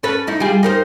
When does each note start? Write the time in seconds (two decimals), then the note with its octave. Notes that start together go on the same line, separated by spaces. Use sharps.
0.03 C#4 A4 B4
0.27 D#4 E4
0.40 G3 F4 G#4
0.63 D#4 A#4 C5